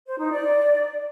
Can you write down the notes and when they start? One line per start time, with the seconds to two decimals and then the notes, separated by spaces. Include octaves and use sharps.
0.07 C5
0.19 D#4
0.31 D5